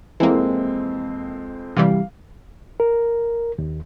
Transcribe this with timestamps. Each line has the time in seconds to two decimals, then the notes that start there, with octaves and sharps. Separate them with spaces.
0.20 F2 E3 G#3 A#3 C4
1.76 C3 E3 G3 F5
2.80 A#4
3.58 D#2